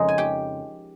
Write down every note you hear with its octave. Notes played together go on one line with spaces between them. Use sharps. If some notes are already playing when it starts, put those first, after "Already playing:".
Already playing: F2 C#3 G#3 D#4 A#4
G#5
G4 G5